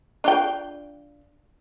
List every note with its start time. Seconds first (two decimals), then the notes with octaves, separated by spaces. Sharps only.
0.24 D4 F4 G5